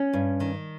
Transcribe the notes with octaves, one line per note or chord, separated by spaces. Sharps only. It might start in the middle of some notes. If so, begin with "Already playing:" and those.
Already playing: C#4
G2
D#3